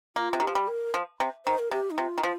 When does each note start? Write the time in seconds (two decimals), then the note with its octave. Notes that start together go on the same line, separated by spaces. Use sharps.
0.16 A#3 F4
0.33 C3
0.40 D#3
0.43 F3 G4
0.55 G3
0.68 A#4
0.94 F3
1.20 C3
1.45 D#3 C5
1.59 A#4
1.71 C3 G4
1.91 D#4
1.98 C3 F4
2.18 D#3
2.23 F3 F4